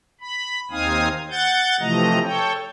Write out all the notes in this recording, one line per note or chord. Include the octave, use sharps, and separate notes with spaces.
B5
D#2 C4 D#4 F5 G#5 D#6
F#5 G6 A6
C3 E3 F3 A3 D#5 A#5
A4 C#5 G5